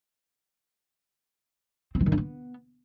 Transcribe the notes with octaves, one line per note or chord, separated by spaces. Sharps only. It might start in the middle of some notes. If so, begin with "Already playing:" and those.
C4
E3
D#3
D4
B3